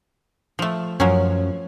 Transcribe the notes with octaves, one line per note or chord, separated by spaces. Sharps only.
F3 A3
F#2 F3 F#3 C#4